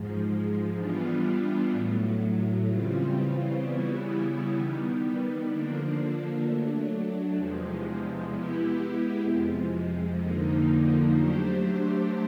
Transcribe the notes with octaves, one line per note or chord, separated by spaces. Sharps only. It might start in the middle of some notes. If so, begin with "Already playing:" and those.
Already playing: G#2 F3 G#3
E3 G3 B3 D4 F4
A2 F#3 A3
C#3 E3 G3 C4 F4
C#3 E3 G3 B3 E4
D#3 G3 B3
D3 F3 A#3 D4
F#3 A3 D4
E2 C3 F3 G#3
G#3 B3 E4 G4
F2 C3 F3 G#3
F2 D3 F3 A#3 D#4
F#3 A3 D4 G4 C5